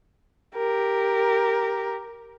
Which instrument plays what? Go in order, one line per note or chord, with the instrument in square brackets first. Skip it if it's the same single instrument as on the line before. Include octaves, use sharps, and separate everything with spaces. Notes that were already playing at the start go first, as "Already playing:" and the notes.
[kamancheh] G4 A#4